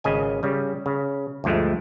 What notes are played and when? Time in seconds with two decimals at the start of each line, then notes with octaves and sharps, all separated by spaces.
0.04 G#1 C#3 D#5 G#5
0.43 C#3 G3
0.86 C#3
1.44 D2 G2 F3 G#3 A3